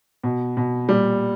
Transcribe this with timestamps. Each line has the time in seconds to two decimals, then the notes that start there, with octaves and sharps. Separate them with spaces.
0.24 B2
0.57 B2
0.89 A#2 G3